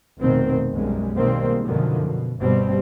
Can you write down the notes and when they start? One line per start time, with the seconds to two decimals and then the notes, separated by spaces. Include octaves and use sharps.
0.20 F1 B2 D#3 C4
0.71 B1 F#2 G3 G#3
1.16 B2 D#3 G3 G#3 A#3 C4
1.64 F#2 B2 D3 D#3 F3
2.03 B2
2.40 G1 G2 B2 G3 C4